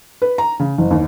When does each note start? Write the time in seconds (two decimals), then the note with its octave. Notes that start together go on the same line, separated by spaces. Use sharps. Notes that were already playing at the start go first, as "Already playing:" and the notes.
0.22 B4
0.38 A#5
0.60 C#3
0.78 F#1
0.91 D#2